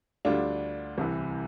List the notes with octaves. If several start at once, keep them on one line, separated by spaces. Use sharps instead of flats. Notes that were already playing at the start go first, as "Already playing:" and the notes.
D2 D3 G3 D4 F4
C2 C3 E3